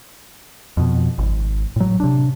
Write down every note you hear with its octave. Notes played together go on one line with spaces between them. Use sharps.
F2 B2
G#1
A2 F#3
C3 D4